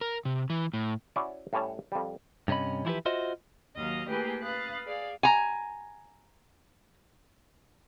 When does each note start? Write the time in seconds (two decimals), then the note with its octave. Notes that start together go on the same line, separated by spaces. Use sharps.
0.01 A#4
0.25 C3
0.50 E3
0.74 A2
1.16 C#4 E4 F#4 D5
1.53 A2 G3 C#4 C#5 A5
1.92 F2 G3
2.48 G2 C3 C#4 D#5 B5
2.85 E3 F3 E4 F4 G4 B4
3.06 F4 F#4 C5 D#5 E5
3.75 D#2 F#3 D#5 F5 A#6
4.08 A3 A#3 E4 G4 G#4 B4
4.41 B4 F5 D#6 F#6 A6
4.85 G#4 D5 F5
5.23 G#5 A#5